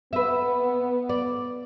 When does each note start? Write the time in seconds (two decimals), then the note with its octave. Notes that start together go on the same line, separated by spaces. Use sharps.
0.13 B3 B4 E5
1.09 D5